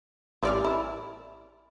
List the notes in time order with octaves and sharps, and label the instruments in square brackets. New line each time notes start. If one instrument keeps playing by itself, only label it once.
[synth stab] A1 D5 F6 [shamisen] E3 G3
[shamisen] E4